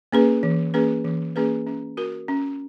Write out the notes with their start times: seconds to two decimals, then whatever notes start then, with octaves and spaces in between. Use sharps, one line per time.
0.12 A#3 C#4 G#4 B4
0.43 E3
0.74 A#3 C#4 G#4 B4
1.05 E3
1.36 A#3 C#4 G#4 B4
1.66 C#4
1.97 F#4 A#4
2.28 C#4